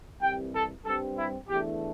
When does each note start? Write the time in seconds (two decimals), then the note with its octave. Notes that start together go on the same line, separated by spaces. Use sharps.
0.22 C2 C3 E3 G3 G5
0.54 A4
0.85 G2 G3 C4 A4
1.17 E4
1.48 E2 E3 A3 D4 G4